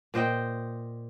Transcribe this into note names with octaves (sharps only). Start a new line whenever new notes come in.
A#2 C5 D#5 G5